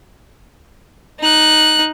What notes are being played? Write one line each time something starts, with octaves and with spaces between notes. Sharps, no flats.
D#4 F#6